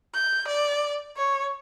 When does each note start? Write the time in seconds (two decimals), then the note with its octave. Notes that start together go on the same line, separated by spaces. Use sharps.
0.14 G6
0.48 D5
1.17 C#5